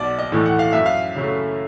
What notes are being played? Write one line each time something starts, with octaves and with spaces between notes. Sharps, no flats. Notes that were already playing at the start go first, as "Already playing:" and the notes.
Already playing: B1 D5
D#5
A2 E3 A3
F#5
F5
F#2 E5
F5
C#3 F#3 A3